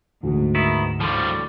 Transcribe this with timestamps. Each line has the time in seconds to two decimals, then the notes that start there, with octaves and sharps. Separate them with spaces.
0.23 D2 G#2
0.55 D#3 B3 E4
1.00 A2 D3 F3 G3